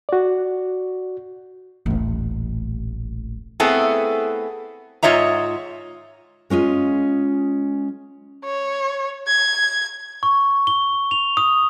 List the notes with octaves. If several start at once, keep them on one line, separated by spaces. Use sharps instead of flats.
F#4 D5
D#1 A1
A3 B3 C4 E4 G#4 A4
G#2 F4 C#5 D#5 E5 A#5
G#3 C#4 F4 D#5
C#5
G#6
C#6
G7
F7
D#6